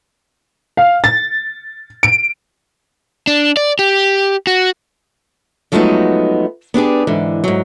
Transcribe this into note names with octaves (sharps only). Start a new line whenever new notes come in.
F5
A6
D7
D4
D5
G4
F#4
F3 F#3 G#3 A3 B3 D#4
B3 D4 G4 G#4
G#2 D3 E3
G#2 F#3